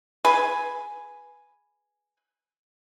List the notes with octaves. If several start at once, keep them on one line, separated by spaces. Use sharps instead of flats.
G#4 B4 G#5